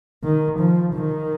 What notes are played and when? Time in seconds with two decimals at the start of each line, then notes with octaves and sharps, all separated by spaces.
0.23 D#3
0.59 F3
0.95 D#3